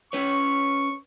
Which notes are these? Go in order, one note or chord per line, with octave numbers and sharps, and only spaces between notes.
C#4 B4 C#5 C#6